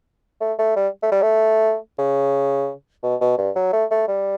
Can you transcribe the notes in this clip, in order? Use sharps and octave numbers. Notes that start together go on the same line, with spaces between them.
A3
A3
G3
A3
G3
A3
C#3
B2
B2
G2
F#3
A3
A3
G3